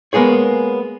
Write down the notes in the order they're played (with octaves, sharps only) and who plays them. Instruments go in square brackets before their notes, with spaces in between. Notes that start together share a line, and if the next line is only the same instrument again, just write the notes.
[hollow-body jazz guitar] G#3 A#3 B3 G#4 C#5